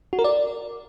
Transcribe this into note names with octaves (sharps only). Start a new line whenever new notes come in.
F#4
A#4
D5